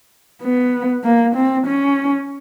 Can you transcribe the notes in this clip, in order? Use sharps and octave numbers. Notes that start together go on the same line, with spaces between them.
B3
A#3
C4
C#4